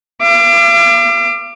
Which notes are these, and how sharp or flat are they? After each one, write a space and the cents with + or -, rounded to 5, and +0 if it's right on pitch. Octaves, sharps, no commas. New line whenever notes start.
F5 -45 D6 +20